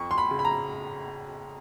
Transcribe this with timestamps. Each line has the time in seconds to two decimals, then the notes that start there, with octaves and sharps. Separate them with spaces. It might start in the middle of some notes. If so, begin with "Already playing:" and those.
Already playing: F2 C#6
0.11 C6
0.18 B5
0.31 C#3
0.39 B5
0.45 A#5